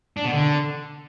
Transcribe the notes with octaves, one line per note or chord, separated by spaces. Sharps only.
D4
B2
D3